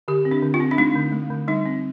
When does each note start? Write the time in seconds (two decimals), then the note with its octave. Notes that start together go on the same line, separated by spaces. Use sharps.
0.08 D3 G4
0.25 C4
0.31 D4
0.43 D3
0.54 F4
0.60 C4
0.71 D4
0.77 A3 D#4
0.95 D3
1.12 A3
1.30 D3
1.48 G3 D#4
1.66 C4